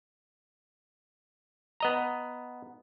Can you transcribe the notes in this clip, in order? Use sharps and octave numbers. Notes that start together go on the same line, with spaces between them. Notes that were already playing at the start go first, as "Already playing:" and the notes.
B3 D#5 A#5